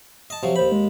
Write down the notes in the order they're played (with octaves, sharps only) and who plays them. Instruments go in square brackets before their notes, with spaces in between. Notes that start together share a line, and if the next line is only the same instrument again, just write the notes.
[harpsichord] D#5 A5
C3 F3 F#3
[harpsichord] D#2 B5 [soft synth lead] C5
[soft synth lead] G#3